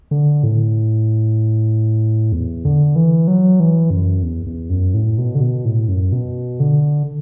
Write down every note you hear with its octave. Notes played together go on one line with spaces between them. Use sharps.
D3
A2
E2
D3
E3
F#3
E3
F#2
E2
E2
F#2
A2
B2
D3
B2
A2
F#2
B2
D3